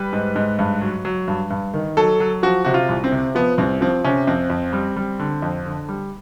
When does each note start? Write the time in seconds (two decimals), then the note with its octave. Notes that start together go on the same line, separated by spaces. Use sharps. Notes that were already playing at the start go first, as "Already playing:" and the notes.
Already playing: G3 B4
0.13 G#2
0.36 G#2
0.59 G2
0.81 F#3
1.05 F#3
1.28 G2
1.51 G2
1.74 D#3
1.97 F#3 A4
2.20 F#3
2.43 F3 F#4
2.65 C3 F#4
2.74 F4
2.89 C2
3.04 C4
3.12 C3
3.35 F3 B3
3.58 C2 C4
3.81 F3 C4
4.04 C3 C#4
4.27 F2 C4
4.50 F2
4.73 G3
4.96 G3
5.19 D3
5.42 F2
5.66 D3
5.89 G3